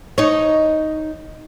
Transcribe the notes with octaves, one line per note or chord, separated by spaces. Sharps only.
D#4 C#5